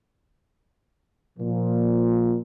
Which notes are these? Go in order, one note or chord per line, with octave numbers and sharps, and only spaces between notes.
A#2 F3